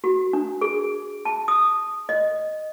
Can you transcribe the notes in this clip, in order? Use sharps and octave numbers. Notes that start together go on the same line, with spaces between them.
F#4
D4
G#4
A5
D#6
D#5